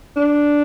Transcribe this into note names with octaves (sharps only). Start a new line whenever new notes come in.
D4